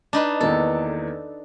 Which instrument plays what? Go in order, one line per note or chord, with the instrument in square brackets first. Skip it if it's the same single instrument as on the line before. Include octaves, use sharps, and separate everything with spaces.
[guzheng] D4 D#4 B4
[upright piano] E2 D#3 A#3 [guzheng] A4